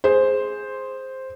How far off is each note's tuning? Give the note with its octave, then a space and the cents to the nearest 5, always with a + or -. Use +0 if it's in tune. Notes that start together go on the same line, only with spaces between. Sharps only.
G#4 +0 C5 +0